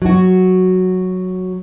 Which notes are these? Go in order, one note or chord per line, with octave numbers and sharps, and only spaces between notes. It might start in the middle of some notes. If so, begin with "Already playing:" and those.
F#3 F#4